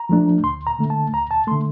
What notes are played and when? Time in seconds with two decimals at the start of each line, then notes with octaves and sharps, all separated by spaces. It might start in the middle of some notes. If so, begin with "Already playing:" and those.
Already playing: A#5
0.09 F3 A3 D4
0.44 D2 C6
0.67 A#5
0.79 D3 A3
0.90 A5
1.13 D2 A#5
1.31 A5
1.47 D3 A3 C6